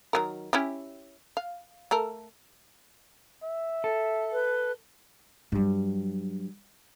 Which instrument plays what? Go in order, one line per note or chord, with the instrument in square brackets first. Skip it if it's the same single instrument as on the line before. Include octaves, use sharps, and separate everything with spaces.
[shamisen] D#3 F#3 A#4
C#4 E4 G4
F5
A3 A4 A#4
[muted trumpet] E5
[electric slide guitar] A4
[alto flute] B4
[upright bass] G2 F#3